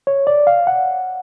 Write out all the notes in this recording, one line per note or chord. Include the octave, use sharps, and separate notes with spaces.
C#5
D5
F5
F#5